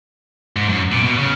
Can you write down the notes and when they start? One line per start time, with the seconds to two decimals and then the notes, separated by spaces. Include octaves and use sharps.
0.56 G#2
0.69 F#2
0.92 A#2
1.03 B2
1.18 C#3